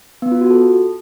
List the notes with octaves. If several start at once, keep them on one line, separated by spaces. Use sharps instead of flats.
B3
F4
F#4
A4